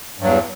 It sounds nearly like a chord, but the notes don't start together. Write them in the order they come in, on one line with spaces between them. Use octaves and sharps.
G2 F#3 E2